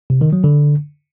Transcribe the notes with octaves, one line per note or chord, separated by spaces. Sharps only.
C3
D#3
F#3
D3